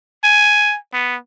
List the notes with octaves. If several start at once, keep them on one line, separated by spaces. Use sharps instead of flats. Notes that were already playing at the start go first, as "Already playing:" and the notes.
G#5
B3